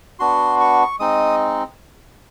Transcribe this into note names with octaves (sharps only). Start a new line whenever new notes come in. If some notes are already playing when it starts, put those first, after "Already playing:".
B3 D4 F#4 C6
C#6
G#3 C4 D#4 D#6